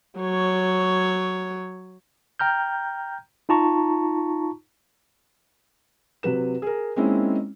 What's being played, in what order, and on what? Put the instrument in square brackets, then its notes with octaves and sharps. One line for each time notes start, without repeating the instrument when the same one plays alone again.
[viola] F#3 C#5
[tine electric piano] G5 A#5 F6 G6
D#4 F4 A5 A#5 C#6
[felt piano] C3 F#3 B4 E7
G#4 A#4
G#3 A#3 C4 C#4 D#4 E4